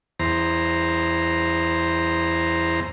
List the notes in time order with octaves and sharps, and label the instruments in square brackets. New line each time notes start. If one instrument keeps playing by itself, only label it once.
[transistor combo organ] E2 C5 A#5